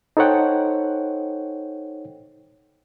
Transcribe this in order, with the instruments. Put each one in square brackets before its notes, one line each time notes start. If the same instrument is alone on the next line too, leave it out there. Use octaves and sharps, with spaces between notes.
[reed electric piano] D#4 A4 C5 C#5 F#5 G5